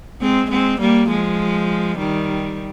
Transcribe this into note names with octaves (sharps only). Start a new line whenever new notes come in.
G#3 C4
G#3 C4
G3 A#3
F3 G#3
D#3 G3